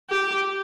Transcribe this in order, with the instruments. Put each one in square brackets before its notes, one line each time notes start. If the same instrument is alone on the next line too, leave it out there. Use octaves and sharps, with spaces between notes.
[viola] G4